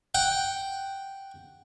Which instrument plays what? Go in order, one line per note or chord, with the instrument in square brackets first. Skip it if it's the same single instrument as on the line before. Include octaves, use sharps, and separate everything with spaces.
[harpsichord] F#5 G5